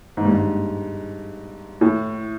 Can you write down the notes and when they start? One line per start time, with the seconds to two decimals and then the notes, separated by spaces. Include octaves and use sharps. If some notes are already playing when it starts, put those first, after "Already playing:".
0.17 G#2
0.25 G2
0.33 G#2
1.81 A2